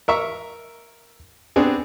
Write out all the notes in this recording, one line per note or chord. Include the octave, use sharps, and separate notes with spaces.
A#4 E5 C#6
B3 C4 D4 G#4